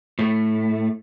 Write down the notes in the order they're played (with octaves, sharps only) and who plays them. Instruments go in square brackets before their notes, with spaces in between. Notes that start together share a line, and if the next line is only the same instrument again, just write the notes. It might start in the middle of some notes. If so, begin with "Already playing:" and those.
[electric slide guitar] A2 A3